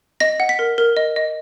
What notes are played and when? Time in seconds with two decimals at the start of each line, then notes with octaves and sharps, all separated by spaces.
0.20 D#5 A#6
0.40 F#5
0.49 B6
0.59 A#4
0.78 A#4
0.97 D#5
1.16 D#5